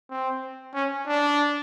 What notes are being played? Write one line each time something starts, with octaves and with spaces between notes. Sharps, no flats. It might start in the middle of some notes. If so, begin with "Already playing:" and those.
C4
C#4
D4